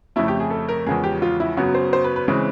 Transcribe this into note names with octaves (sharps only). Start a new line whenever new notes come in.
F2 C#3 F3 A3 E4
G4
G#4
A4
A#4
E2 C#3 F3 G#3 G#4
G4
F4
E4
F#2 C#3 F#3 B3 F#4
C5
C5
B4
B4
C#3 E3 G#3 C4